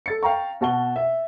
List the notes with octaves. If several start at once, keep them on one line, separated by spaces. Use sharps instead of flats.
A4 A6 C#7
F5 G5 A#5 C#6
B2 F#4 A5 C#6 G7
E5